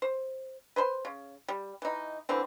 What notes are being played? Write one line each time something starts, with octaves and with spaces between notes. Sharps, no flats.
C5
B4 C5 B5 C6
C#3
G3
E3 D#4
D3 E3 C4